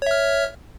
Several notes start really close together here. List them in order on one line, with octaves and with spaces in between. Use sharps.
C#5 E5 F6